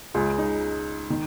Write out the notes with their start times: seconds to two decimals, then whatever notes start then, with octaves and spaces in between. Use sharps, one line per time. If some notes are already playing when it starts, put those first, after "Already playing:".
0.14 C#2 C#3 G#3 F4
0.38 D#4
1.10 D#3